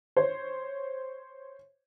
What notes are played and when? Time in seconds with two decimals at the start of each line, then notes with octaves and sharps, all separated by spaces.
0.17 C5 C#5